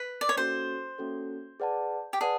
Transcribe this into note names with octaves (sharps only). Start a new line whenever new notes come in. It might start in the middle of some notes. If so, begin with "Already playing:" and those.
Already playing: B4
D5
C#5
A#3 C#4 F#4 A4 C5
A#3 C#4 F#4 A4
G#4 B4 D5 F#5 A5
G4
G#4 B4 D5 F#5 A5